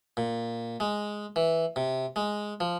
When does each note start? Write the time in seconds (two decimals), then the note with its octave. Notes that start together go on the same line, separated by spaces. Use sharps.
0.17 A#2
0.80 G#3
1.36 E3
1.76 C3
2.16 G#3
2.60 F3